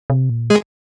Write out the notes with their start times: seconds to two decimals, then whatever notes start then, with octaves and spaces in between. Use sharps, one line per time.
0.10 C3
0.30 A#2
0.50 G#3 G#4